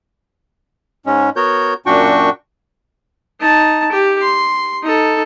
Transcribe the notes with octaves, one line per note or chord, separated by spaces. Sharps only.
G#2 G#3 C#4
B3 F#4 A#4 C#5 G6
F#2 A#2 D4 F#4 G5 C#6
D#4 A5
G4
C6
D#4 A4